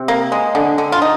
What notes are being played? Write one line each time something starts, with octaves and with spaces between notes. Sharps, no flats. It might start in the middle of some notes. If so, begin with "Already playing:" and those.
Already playing: C3
A#3
G#3
D3
D3
F4
D#4